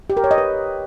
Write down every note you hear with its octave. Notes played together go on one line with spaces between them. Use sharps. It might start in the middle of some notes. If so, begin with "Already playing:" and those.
G4
A#4
C#5
D#5
B4